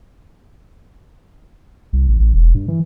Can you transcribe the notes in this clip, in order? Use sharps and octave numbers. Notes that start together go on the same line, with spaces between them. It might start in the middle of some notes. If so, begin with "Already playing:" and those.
C2
A1
A1
E1
G2
E3